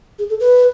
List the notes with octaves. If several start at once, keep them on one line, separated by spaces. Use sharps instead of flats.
G#4
A4
B4